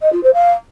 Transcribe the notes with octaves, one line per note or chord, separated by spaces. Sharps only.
D#5
F4
C5
F5